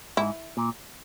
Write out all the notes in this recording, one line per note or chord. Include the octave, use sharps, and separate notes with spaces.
G#2 E4
A#2